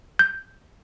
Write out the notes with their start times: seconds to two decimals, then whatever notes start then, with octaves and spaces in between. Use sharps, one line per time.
0.19 G6